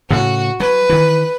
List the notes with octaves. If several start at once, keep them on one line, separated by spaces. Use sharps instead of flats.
A2 C#3 F#4
F#3 B4
D#3 E3